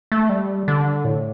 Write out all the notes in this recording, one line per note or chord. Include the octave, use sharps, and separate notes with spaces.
A3
G3
D3
A2